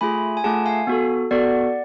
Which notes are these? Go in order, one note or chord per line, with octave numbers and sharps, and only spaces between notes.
A3 F4 G#4 G#5 B5
G#5
A3 F4 G#4 F#5 A5
F5 G#5
B3 F#4 A4
B3 F#4 A4 D5 F#5